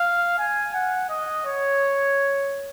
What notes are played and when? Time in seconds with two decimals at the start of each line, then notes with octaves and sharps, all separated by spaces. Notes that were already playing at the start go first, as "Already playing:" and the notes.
Already playing: F5
0.38 G#5
0.74 F#5
1.09 D#5
1.45 C#5